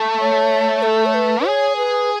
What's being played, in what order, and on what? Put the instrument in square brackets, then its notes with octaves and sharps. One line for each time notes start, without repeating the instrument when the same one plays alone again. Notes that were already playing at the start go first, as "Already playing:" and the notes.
Already playing: [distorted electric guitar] A3
[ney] C#5
A4
C#5
B4
B4
[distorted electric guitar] G#4 [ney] C#5
[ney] B4